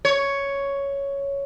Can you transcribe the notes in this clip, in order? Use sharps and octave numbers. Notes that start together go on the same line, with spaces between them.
C#5